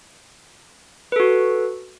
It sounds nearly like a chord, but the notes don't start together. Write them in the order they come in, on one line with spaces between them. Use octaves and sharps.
B4 A4 F#4